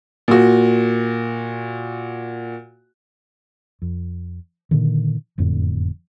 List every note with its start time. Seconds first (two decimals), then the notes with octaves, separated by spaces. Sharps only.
0.28 A#2 F#4
3.82 F2
4.71 A#2 D3 D#3
5.38 F#1 F2 A2 D3